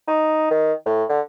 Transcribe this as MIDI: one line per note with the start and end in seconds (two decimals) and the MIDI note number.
0.08 0.46 63
0.51 0.73 51
0.86 1.04 45
1.09 1.20 50